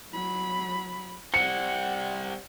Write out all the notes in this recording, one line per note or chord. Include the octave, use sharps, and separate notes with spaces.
F#3 B5
G3 C4 F#5 C#7